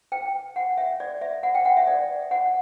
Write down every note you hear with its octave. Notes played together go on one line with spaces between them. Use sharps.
G5
F#5
E5
D5
E5
F#5
G5
F#5
E5
D5
F#5